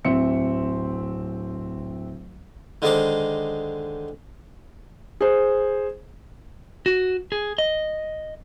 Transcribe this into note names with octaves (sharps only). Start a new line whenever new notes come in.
D1 C4 E5 C#7
D3 D#3 G#3 C5 D6
G#4 C5
F#4
G#4
D#5